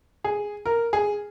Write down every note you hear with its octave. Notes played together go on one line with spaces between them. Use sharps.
G#4
A#4
G#4